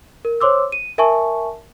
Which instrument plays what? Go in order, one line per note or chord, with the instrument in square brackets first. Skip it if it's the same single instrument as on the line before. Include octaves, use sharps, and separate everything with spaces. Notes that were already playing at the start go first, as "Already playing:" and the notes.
[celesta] A#4
C5 C#5 C6 D6 E6
D#7
A#4 E5 G#5 A5 C#6